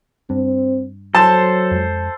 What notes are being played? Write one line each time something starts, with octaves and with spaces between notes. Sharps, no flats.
G2 C4
F#3 A4 C5 A5
F2 G#3